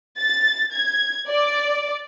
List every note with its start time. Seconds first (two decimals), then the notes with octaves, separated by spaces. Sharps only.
0.20 A6
0.74 G#6
1.29 D5